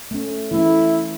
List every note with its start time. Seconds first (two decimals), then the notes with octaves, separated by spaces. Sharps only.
0.11 A3 C#4
0.51 E3 A3 C#4 E4